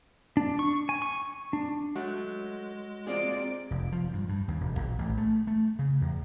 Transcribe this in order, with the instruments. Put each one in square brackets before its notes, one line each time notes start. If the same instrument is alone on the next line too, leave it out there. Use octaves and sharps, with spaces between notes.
[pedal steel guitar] D4
C#6
G#5
C#6
D4
[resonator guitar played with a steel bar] F#3 A3 [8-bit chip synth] G#3 [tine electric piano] F#4
[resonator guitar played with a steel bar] A#3 F4 G#4 [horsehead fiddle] C4 D5
[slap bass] F1
F3
G2
G2
D#2
E1
A#1
A1
A3
A3
C#3
E2